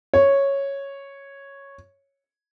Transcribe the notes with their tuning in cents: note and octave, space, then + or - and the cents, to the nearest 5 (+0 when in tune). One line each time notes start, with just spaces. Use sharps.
C#5 -5